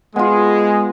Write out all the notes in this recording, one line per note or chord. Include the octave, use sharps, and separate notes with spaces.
G#3 B3 F4